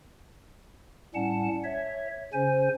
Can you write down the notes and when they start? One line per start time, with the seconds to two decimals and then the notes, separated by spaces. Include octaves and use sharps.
1.15 A2 G3 C#4 F#5 A5
1.64 C#5 E5
2.33 C#3 C#4 C5 G#5